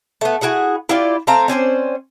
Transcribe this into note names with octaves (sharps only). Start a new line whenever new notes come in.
A3 B3
E4 F#4 G#4 F#5
E4 F4 G4 D5
A3 C4 F5 A#5
C4 C#4 C5 D5